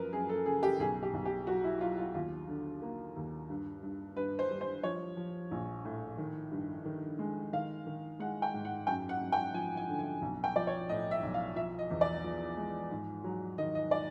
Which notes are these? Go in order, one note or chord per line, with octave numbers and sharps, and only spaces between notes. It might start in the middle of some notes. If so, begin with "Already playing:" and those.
Already playing: F#2 F3 A#4 B4
F#2 G#4
A4
C#3 G#4
G4
B1 G#4
G4
B1
G4
F#3 F#4
E4
F#3 F4
F4
D#2 F4
D3
A#3
D#2
G2
G2
G2 B4
C5
G3
C5
F3 C#5
F3
A#1
A2
D#3
G2
D#3
G#3
D#3 F5
D#3
G#3 F#5
G5
G#2
F#5
F#2 G5
F#5
F#2
G5
F3 G#5
G#5
D3
G#5
B1
G5
F3 D5
C#5
A2 D#5
E5
B1
F5
F3 E5
D#5
E2
D5
F3
G#3
G#2
F#3
D#3 D#5
D#5
D5